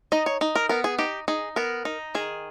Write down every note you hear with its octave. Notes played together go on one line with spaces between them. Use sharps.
D#4 D#5
C#5
D#4
A#4
B3 A#4
G#4
D#4 G4
D#4 G#4
B3 A#4
D#4
D#3 G#4